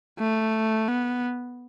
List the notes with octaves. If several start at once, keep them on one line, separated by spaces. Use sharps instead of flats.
A3
B3